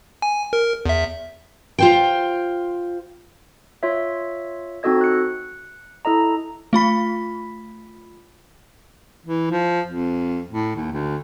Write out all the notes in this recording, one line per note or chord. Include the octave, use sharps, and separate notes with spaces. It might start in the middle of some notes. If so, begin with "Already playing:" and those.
G#5
A#4
E2 E5
F4 C5 G5
F4 C#5 E5
C4 D#4 F#4 A4 D#5 G#6
F#6 C#7
E4 A4 D#5 A#5
A3 F4 B5 B6
E3
F3
F2
A2
D#2
D2